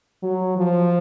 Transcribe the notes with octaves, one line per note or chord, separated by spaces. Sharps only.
F#3
F3